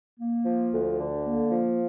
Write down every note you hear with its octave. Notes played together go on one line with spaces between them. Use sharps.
A#3
F3
D2
D3
A#3
F3